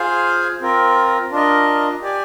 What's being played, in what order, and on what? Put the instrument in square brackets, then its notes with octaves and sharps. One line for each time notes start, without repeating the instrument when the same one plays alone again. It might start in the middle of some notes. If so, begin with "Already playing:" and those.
Already playing: [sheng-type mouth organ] F4 G#4 C5 F5 G#5
C4 F4 A#4
D4 F4 A#4 D#5
G4 D5 G#5